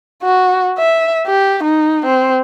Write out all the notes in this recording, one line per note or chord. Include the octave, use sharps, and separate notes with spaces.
F#4
E5
G4
D#4
C4